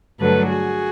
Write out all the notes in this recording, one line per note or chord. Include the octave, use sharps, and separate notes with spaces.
G2 D3 F#3 A3 A4 B4
F#4 G#4